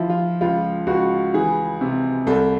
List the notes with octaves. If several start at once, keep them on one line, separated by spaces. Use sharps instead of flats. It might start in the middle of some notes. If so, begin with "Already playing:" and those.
Already playing: F3 E4
F4
C#2 F4
C#2 F#4
E3 G#4
C3
C2 A4